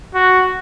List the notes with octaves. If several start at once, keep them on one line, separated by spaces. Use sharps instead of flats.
F#4